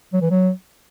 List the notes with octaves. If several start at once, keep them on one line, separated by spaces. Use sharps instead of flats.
F#3
E3
F#3